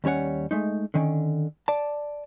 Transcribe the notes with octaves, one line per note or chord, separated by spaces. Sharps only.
D#2 G3 C#4 C#5 F#5
G#3 A3 D#4
D3 D#3 C#4
D5 A5